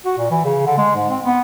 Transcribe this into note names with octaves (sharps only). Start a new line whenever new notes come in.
F#4
A#2
E3
C#3
D3
G#3
G#2
C4
B3